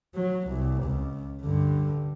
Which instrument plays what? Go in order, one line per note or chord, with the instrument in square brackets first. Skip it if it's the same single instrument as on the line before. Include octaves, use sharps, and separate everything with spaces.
[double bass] F#3
C2
C#2
G2 D3